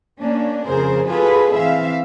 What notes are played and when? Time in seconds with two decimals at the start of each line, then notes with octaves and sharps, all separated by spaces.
0.20 A#3 C#4 D4
0.67 F2 C#3 G#4 A#4 C5
1.08 F4 F#4 G#4 A4 B4
1.55 E3 C4 E5 F5